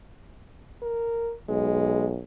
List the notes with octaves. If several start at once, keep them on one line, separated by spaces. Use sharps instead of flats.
A#4
B1 G#3